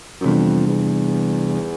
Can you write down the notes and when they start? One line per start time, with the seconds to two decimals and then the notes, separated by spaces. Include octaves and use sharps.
0.21 F#2
0.25 F2 C3 E3 G3 B3 D4
0.67 E2